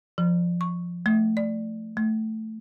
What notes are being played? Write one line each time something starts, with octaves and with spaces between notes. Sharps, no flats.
F3
C#6
A3
D5
A3